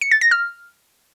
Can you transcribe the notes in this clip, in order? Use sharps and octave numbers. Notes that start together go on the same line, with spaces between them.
C#7
A6
A#6
F6